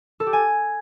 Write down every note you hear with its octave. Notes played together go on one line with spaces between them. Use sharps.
A4
G4
G#5